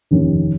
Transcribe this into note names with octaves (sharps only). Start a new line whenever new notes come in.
F1 D#2 D#3 C#4